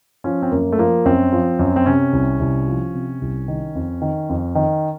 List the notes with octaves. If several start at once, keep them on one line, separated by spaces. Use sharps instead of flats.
F3 C#4
C4
F#2 A#3
A3
F3 A#3
F#2 C4
F3
F#2
C4
C3 C#4
C2
C2
F3
C3
C2
D#3
F2
D#3
F2
D#3